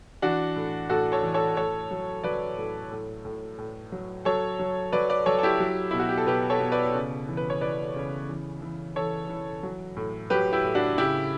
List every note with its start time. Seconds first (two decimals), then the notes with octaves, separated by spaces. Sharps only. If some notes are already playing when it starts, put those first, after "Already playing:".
0.22 E3 D4 F#4
0.56 A2
0.89 A2 F#4 A4
1.12 A4 C#5
1.23 E3
1.34 A4 C#5
1.57 A2 A4 C#5
1.91 F#3
2.24 F#3 B4 D5
2.58 A2
2.91 A2
3.25 A2
3.59 A2
3.92 F#3
4.25 F#3 A4 C#5
4.59 F#3
4.92 F#3 B4 D5
5.10 B4 D5
5.26 F#3 A4 C#5
5.39 A4
5.43 E4 G4
5.60 F#3
5.91 B2 E4
5.99 F#4
6.09 G4
6.18 A4
6.27 B2 G4 B4
6.50 A4 C#5
6.60 B2
6.72 B4 D5
6.95 C#3
7.29 E3
7.37 B4
7.50 C#5
7.61 E3 B4 D5
7.96 C#3
8.29 E3
8.62 E3
8.96 E3 A4 C#5
9.29 E3
9.63 F#3
9.96 A2
10.30 F#3 G4 B4
10.53 E4 G4
10.64 A2
10.75 D4 F#4
10.97 C#3 E4 G4